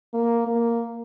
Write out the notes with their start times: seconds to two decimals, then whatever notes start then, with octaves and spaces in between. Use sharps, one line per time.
0.14 A#3
0.47 A#3